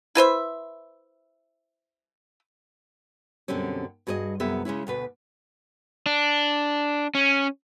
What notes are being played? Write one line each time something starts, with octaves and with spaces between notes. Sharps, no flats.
E4 B4 C5 E5
F#2 B2 D3 G3 C4 C#4
G2 F#4 G#4 C5 D#5
F#2 C3 B3 G#4 E5
C#3 G#3 C#4 E4
D2 B2 B4
D4
C#4